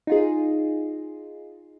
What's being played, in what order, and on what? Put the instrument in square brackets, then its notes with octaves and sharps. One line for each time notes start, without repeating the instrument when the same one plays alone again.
[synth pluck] D#4 F4 G#4